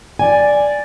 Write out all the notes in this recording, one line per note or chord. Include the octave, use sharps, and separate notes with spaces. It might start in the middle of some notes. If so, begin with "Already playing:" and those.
D5 G#5